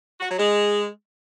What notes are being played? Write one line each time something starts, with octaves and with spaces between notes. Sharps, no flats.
F#4
F#3
G#3